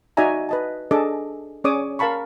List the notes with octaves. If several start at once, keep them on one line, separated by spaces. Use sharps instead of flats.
D#4 F#4 D5 E5 G#5 A#5
B4 D#5 A5
D4 G#4 A4 D#5 D6
C#4 G#4 C#5 D5 D6 D#6
A#4 F5 A5 B5 C#6